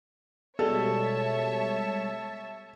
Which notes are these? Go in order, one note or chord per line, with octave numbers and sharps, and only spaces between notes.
B2 G3 G#3 A4 C#5 E5 A5